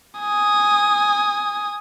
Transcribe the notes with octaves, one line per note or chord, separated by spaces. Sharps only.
G#5 D#6